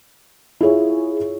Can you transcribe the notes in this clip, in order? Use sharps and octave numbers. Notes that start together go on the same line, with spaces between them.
E4 F4 G#4 C#5